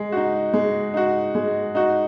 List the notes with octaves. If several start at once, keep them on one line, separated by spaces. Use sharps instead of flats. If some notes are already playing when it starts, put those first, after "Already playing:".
Already playing: G#3
D#4 F#4
G#3
D#4 F#4
G#3
D#4 F#4